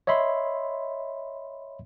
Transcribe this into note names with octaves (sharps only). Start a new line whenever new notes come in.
C#5 D#5 E5 B5 C6